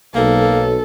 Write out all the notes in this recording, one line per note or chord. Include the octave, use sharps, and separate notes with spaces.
B1 A#3 A4